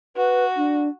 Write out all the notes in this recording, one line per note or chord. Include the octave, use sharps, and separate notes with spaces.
F#4 B4
D4